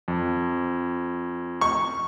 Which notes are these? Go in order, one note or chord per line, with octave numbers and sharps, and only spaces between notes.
F2
C#6